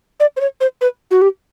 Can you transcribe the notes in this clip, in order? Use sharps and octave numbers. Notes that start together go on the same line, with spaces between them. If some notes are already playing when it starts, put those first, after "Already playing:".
D5
C5
C#5
C5
B4
F#4
G4